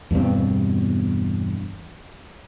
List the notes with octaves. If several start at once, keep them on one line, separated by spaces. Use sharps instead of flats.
E2 G2 B2 C4